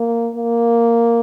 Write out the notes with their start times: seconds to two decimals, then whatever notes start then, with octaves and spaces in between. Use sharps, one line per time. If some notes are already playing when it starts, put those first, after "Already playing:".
Already playing: A#3
0.36 A#3